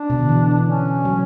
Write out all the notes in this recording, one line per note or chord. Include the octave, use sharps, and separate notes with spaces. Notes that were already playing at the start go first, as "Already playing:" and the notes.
Already playing: D4
B2
D3
E3
C#4
F#3